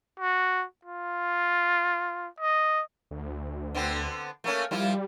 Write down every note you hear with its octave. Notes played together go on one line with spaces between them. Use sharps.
F#4
F4
D#5
D2
D3 B3 C4
A3 A#3 C#4
F3 G3 E4 F4